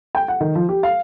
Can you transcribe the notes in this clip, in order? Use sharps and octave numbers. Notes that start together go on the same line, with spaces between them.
G5
F#5
D#3
F3
G4
F5